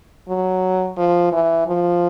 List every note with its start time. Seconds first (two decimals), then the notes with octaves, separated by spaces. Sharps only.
0.28 F#3
0.97 F3
1.32 E3
1.67 F3